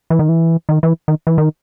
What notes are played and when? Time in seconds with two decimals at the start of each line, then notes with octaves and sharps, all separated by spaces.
0.10 E3
0.19 D#3
0.29 E3
0.69 D#3
0.83 E3
1.08 D#3
1.27 E3
1.38 D#3